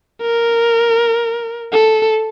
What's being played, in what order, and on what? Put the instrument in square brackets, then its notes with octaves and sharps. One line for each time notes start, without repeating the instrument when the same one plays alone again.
[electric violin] A#4
A4